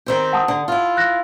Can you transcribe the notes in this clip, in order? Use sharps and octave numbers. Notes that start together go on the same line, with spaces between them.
D#3 C4 G4
F#5 A5 D#6
D3
E4 F4
F#6 A#6